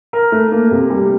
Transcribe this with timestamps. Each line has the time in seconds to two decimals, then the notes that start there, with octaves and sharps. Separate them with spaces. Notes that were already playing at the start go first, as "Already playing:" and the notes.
0.13 A#4
0.32 A3
0.52 A#3
0.71 C3
0.90 G3